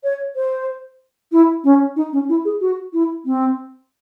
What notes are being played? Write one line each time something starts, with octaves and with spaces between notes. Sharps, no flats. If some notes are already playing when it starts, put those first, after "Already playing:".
C#5
C5
E4
C#4
D#4
C#4
E4
G#4
F#4
E4
C4